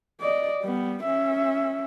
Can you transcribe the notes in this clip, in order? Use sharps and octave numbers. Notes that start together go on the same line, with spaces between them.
D5 D#5
G3 B3
C#4 E5